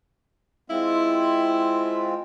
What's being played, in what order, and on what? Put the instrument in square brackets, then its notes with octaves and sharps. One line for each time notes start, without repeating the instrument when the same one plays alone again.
[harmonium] G#3 C4 F4 [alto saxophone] E4